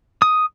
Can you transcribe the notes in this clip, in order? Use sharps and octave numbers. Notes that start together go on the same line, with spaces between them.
D#6